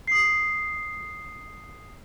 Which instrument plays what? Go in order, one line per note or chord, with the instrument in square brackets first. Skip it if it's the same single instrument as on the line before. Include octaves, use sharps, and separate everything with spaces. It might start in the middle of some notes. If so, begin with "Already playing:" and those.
[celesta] D#6 C7